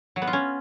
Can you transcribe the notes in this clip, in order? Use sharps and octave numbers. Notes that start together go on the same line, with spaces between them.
F#3
B3
F4
C#4